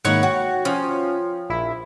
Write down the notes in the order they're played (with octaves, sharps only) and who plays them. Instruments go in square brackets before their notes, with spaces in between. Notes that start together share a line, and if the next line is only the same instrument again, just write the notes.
[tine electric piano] G#2 D#3 A#3 [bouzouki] D#4 E4 C#5 [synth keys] F#5 C#6
[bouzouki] F#4 [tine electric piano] C#5 G5
[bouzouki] F3 [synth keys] C#4
[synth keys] A#1 E4